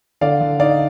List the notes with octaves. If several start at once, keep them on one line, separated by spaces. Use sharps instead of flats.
D3 D5 F5
D3
D#4 D5 F5